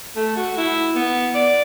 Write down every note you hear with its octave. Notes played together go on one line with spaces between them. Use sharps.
A3
F#4
E4
B3
D5